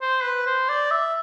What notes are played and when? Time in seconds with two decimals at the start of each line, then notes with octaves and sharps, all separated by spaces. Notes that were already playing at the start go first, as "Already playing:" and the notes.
0.01 C5
0.23 B4
0.46 C5
0.69 D5
0.91 E5